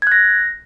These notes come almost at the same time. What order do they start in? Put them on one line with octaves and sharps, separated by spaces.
G#6 F#6 A#6